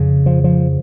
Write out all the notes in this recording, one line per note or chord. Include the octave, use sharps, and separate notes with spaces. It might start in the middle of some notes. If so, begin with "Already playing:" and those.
Already playing: F2 C#3
F3
F3